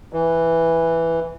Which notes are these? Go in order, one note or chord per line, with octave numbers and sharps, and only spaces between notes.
E3